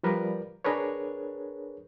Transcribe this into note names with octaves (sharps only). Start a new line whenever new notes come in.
F3 G3 A#4 B4 D5
D4 G#4 A#4 B4 C#5